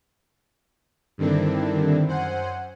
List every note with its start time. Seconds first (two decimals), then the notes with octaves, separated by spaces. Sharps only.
1.18 G2 D3 D#3 C4 D4 E4
2.07 F#2 C5 F#5 G#5